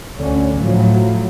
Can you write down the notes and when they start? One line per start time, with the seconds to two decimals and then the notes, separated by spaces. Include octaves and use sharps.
0.16 D2 D3 C#4
0.58 A2 F3 F#3